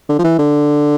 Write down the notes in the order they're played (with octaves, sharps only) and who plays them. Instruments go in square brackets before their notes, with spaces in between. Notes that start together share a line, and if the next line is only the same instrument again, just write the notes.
[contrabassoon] D3
F3
E3
D3